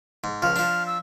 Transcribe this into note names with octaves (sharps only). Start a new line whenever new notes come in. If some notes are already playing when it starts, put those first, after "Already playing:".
G#2
C#2 F3 F6
F3 D4
E6